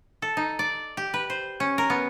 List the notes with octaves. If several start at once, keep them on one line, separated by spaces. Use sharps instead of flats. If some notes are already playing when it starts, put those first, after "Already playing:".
A4
D#4
D5
G4
B4
C5
C#4
A#4
B3